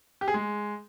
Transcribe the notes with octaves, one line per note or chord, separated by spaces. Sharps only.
G4
G#4
G#3